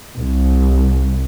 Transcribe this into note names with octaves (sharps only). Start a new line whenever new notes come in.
C2